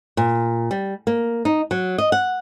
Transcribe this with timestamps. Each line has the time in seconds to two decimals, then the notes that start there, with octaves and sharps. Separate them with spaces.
0.17 A#2
0.71 G3
1.07 A#3
1.45 D#4
1.71 F#3
1.98 D#5
2.12 F#5